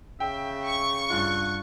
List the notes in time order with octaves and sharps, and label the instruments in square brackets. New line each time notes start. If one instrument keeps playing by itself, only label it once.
[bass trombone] C#3 [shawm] E5 [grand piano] G5
[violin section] C#6
[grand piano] G2 F4 [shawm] F#5